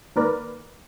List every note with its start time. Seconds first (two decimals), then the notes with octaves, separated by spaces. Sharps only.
0.16 G#1 D#3 A#3 A#4 B4 D5